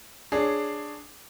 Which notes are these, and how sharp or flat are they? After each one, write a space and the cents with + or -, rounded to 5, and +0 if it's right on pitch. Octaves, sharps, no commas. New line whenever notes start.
D4 +5 G#4 +0 C#5 +5